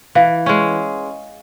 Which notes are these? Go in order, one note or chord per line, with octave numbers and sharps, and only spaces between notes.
E3 F5
G#3 C#4